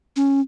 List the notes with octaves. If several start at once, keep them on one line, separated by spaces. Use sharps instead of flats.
C#4